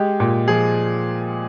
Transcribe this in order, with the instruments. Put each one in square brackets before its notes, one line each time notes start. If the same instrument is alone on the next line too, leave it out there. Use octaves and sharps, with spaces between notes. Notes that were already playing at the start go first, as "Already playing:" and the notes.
Already playing: [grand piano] G#3 G4
A#2
F3 G#4